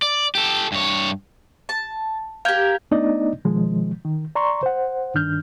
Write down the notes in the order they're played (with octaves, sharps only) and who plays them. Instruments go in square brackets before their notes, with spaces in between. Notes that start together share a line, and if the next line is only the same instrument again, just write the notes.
[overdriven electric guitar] D5
G4 A4
G2 C#5
[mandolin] A5
[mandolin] G4 A#4 [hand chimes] F5 G6 G#6
[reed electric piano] A3 B3 D4 D#4 D5 D#5
B2 D#3 F3 G#3
D#3
D5 A#5 C6 C#6
C5 F#5
G2 D#3 D4 F6 G6